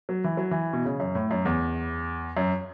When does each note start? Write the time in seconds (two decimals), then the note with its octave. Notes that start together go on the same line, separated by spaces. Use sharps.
0.09 F#3
0.24 E3
0.37 F#3
0.51 E3
0.73 B2
0.85 C#3
1.00 F#2
1.15 A2
1.31 F#2
1.45 E2
2.37 F#2